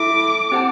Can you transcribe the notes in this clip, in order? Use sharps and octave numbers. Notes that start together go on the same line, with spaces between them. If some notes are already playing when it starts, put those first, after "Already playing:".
Already playing: E4 A4 E5 D6
C4 G4 C5 F#5 A5